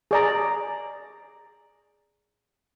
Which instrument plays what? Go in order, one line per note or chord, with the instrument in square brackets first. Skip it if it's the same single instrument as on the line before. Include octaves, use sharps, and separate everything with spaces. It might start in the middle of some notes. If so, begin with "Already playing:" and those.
[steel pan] G#4 D5 A#5